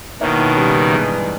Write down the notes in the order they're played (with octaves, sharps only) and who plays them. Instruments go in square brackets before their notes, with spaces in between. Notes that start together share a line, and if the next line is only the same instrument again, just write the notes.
[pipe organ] B2 D#3 [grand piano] A#3 E4 A#4 C#5
[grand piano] C#3 G3 A#3
G2 E3 G#3